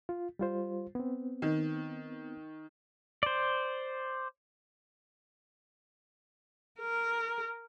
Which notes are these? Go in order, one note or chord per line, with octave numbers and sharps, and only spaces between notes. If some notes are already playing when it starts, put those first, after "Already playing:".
F4
G3 F4 C5
B3 C4
D#3
C5 D5
A#4